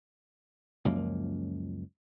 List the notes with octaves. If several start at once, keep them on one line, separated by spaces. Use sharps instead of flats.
C#2 F#2 F3 A#3